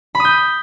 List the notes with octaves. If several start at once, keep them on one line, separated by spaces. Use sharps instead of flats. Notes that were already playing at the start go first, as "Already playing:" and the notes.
B5
D#6
G6